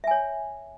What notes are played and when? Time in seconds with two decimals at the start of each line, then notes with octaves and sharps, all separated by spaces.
0.04 E5
0.07 G#5
0.11 C#5